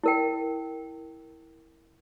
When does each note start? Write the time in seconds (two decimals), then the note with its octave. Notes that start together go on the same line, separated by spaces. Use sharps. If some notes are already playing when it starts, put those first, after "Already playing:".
0.04 E4 A#4 G5